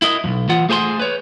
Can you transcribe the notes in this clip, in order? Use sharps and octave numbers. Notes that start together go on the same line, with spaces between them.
E4 A#4 D#5
B1 F2
E3 F4 F#5
A3 G#4 C5 G#5 A5 C6
B4 C#5